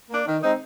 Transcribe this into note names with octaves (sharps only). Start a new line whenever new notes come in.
A#3 D4
D#3
G#3 C4 D#4